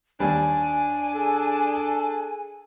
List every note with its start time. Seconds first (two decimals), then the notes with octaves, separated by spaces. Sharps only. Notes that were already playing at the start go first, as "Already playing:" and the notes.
0.20 D#2 G3 D4 G#5
1.15 G#4 A4